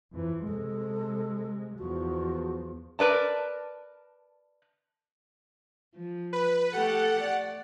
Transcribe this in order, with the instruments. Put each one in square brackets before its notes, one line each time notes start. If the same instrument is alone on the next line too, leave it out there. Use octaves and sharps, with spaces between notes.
[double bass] F2 E3
[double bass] C3 G#3 [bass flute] A4
[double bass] E2 F3 [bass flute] F#4
[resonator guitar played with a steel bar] A#4 B4 D5 A5
[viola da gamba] F3
[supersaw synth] B4
[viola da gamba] A3 G4 A4 [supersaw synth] F#5
[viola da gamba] D5